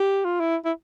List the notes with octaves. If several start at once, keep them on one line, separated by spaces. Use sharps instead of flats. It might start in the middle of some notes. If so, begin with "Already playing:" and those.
Already playing: G4
F4
E4
E4